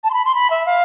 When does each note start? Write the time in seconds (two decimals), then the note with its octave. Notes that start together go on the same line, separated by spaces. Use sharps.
0.04 A5
0.10 C6
0.14 B5
0.25 C6
0.35 B5
0.50 E5
0.66 F5